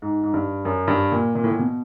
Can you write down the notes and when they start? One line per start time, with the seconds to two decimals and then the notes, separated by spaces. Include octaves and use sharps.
0.02 G#2
0.23 G#2
0.34 G2
0.65 F#2
0.88 G2
1.12 A#2
1.35 A#2
1.44 A2
1.51 A#2
1.59 B2